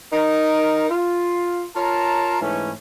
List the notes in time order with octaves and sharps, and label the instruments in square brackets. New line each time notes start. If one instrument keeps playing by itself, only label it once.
[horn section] D#4 A#4
F4
F4 A#4 C#5 A5 A#5
G#2 E3 A3 C#4